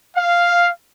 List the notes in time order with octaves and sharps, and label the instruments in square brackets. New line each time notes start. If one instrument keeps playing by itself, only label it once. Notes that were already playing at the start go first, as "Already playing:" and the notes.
[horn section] F5